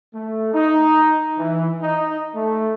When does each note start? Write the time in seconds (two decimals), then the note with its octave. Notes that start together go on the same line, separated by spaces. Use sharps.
0.15 A3
0.54 D#4
1.38 E3
1.81 D#4
2.35 A3